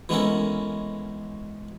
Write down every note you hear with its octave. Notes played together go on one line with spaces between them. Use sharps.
E3 G#3 B3 C#4 A4 A#4